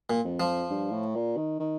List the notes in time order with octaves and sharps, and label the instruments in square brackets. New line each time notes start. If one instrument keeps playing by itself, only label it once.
[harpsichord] A#2
[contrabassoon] F2
[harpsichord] F3
[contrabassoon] G2
A2
A#2
D#3
D#3